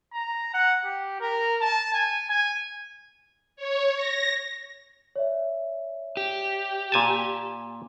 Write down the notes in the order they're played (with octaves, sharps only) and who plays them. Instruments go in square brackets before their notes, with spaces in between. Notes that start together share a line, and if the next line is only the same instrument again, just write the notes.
[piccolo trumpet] A#5
F#5
G4
A#4
A5
G#5
G#5
[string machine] C#5
A#6
[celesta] C#5 D5 E5
[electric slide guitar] G4
[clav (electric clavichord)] A#2 G#5 A5